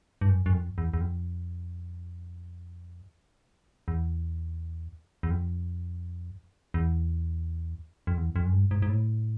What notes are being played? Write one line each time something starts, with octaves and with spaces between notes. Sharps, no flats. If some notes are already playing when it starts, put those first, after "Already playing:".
G2
F#2
F#2
F2
E2
E2
F2
E2
E2
F2
E2
F2
E2
F2
F#2
G2
G#2
G#2
A2